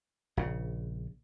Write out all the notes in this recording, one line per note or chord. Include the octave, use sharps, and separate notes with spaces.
A#1 C#3